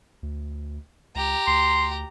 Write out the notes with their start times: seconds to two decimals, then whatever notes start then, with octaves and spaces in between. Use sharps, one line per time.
0.23 D2
1.15 C#2 G4 A#5
1.47 D2 C6